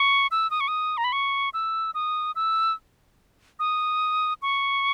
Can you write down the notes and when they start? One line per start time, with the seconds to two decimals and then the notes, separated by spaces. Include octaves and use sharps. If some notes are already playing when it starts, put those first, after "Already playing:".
Already playing: C#6
0.31 E6
0.51 D#6
0.60 C#6
0.68 D#6
0.97 A#5
1.04 B5
1.12 C#6
1.54 E6
1.94 D#6
2.36 E6
3.59 D#6
4.42 C#6